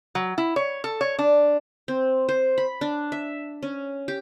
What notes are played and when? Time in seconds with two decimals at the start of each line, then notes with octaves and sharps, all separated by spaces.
0.15 F#3
0.38 E4
0.56 C#5
0.84 A4
1.01 C#5
1.19 D4
1.88 C4
2.29 C5
2.58 B5
2.81 D4
3.12 E5
3.63 C#4
4.08 G4